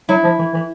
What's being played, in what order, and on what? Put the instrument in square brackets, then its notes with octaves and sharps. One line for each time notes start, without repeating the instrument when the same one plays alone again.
[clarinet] F#3 [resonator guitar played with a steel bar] E4
[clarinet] F3
E3
E3